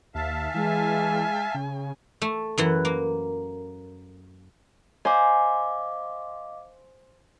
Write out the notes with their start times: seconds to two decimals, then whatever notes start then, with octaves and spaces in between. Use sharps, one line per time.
0.15 D#2 E5 F5 A5
0.54 E3 G#3 G#5
1.54 C#3
2.22 A3
2.58 F#2 E3 F#5
2.85 A#3
5.05 C5 D#5 F5 G#5 C6 D6